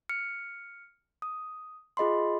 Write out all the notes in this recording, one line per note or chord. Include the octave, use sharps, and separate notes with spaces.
F6 C#7
D#6
F4 G#4 D#5 B5 C6